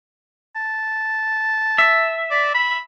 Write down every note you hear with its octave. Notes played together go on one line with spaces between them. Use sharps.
A5
E5
D5
B5